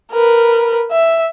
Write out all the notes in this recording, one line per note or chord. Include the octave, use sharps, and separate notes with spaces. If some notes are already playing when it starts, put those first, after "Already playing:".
A#4 B4
E5